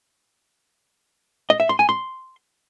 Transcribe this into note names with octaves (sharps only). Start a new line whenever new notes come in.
D#5
E5
C6
G#5
C6